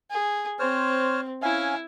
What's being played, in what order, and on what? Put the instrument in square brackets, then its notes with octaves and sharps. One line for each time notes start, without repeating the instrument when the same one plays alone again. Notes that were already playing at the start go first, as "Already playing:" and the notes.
[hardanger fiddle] G#4
[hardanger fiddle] C4 [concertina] C5 C#5 F6
[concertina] C#4 F5 G#5 [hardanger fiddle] E4